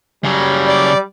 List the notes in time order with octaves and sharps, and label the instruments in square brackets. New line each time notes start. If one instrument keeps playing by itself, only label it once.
[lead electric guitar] C#3 F#3 [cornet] G3
[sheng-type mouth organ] D5